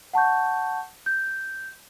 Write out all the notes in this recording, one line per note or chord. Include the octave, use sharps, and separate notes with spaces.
F#5 A5 C#6 G6
G6